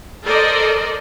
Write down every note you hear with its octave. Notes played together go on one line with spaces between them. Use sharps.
A4 A#4 C5 D5 D#5